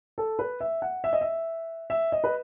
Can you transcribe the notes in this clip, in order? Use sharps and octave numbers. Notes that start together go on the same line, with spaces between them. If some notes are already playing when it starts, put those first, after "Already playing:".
A4
B4
E5
F#5
E5
D#5
E5
E5
D#5
B4